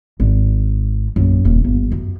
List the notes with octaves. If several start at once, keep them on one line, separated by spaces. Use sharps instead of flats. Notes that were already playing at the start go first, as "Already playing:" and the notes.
G#1
A#1 F#2
D#1
G1
F#2